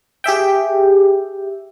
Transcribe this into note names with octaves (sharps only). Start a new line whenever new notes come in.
G4 G#4 E5 G5